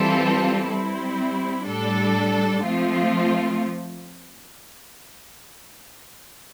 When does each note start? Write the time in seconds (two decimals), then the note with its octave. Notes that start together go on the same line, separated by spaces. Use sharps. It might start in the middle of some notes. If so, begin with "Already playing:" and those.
Already playing: E3 G3 C4 F4 A4
0.67 G3 C4 E4
1.66 A2 G3 D4 A4
2.65 F3 A3 C4 F4